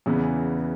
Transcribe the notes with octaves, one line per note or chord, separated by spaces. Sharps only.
E2 C#3 E3 B3